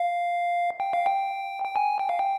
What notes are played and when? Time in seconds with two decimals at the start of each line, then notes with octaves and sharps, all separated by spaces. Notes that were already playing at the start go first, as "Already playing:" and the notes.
Already playing: F5
0.80 G5
0.93 F5
1.06 G5
1.64 G5
1.76 G#5
1.99 G5
2.09 F5
2.19 G5